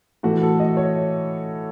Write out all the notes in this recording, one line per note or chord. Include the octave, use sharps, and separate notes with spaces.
A2 E3 A3 F#4
A4
D#5
C#5